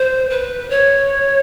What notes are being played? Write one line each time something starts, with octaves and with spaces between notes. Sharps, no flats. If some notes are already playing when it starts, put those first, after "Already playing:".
Already playing: C5
B4
C#5